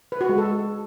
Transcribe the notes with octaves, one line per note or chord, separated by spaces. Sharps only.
B4
F#4
G#3
A4